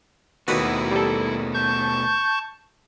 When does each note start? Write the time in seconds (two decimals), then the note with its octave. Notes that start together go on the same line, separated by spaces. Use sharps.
0.48 D#2 B2 A3 B3 D#4 E4 F#4 B4
0.91 G3 A4
1.54 A5 C#6 G6